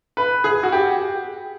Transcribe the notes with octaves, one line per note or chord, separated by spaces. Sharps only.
B4
G#4
F#4
G4